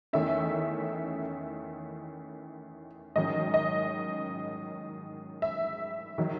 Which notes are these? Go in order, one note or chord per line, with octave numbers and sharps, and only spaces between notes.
E2 D#3 A3 C#4 E5
G#2 D#3 F#3 C#4 D#5
D#5
E5
D#3 F#3